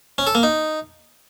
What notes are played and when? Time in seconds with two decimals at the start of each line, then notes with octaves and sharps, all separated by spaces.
0.18 C#4
0.27 A4
0.35 A#3
0.43 D#4